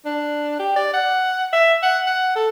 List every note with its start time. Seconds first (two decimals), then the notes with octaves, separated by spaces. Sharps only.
0.05 D4
0.59 G4
0.76 D5
0.93 F#5
1.53 E5
1.83 F#5
2.06 F#5
2.35 A4